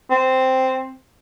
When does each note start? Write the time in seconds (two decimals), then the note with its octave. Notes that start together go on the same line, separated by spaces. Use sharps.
0.10 C4